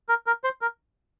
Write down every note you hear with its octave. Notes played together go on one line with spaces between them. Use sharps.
A#4
A#4
C5
A#4